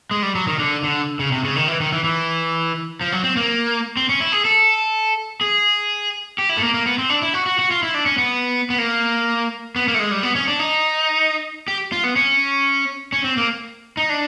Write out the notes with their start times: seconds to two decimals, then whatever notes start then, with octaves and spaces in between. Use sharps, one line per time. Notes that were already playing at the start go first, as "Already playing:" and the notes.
0.11 G#3
0.23 G3
0.35 F#3
0.47 D#3
0.59 D3
0.84 D3
1.19 C#3
1.32 C3
1.44 C#3
1.56 D#3
1.68 E3
1.80 D#3
1.92 E3
2.04 E3
3.01 F3
3.12 F#3
3.24 C4
3.37 A#3
3.97 C4
4.09 C#4
4.20 E4
4.32 G#4
4.45 A4
5.41 G#4
6.38 G4
6.49 E4
6.57 A3
6.62 A#3
6.74 A#3
6.86 B3
6.98 C4
7.09 D4
7.22 E4
7.34 F#4
7.46 F#4
7.59 F#4
7.71 F4
7.83 E4
7.94 D4
8.06 C#4
8.18 B3
8.70 B3
8.78 A#3
9.76 B3
9.88 A#3
9.94 A3
9.99 G#3
10.11 G3
10.23 B3
10.35 C#4
10.47 D4
10.59 D#4
11.68 G4
11.92 F4
12.04 B3
12.16 C#4
13.12 C#4
13.24 C4
13.37 A#3
13.97 D#4
14.09 D4